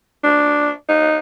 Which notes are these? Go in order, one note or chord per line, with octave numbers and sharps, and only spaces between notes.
D4
D#4